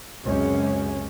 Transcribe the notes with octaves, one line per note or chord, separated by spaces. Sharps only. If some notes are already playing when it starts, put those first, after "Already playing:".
C#2 F#2 C3 G#3 C#4